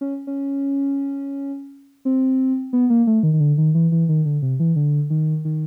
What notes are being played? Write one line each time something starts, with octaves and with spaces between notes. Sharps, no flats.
C#4
C#4
C4
B3
A#3
A3
D#3
D#3
D3
D#3
E3
E3
D#3
D3
C3
E3
D3
D#3
D#3